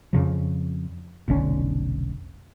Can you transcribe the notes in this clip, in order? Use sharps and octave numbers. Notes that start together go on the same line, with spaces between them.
F2 C#3 F3
F1 B1 D3 C#4